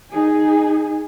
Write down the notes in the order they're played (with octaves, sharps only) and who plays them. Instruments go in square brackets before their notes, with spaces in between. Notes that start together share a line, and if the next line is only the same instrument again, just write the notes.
[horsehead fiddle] D#4 G#4